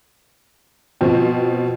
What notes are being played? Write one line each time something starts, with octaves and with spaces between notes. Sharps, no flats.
B2 F3 C4